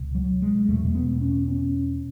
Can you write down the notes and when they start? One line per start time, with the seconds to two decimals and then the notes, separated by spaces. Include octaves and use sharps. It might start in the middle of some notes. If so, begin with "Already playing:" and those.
Already playing: C#2 B2
0.15 F#3
0.42 G#3
0.68 E2 B2 A3
0.86 A3
0.95 B3
1.21 C#4
1.48 C#4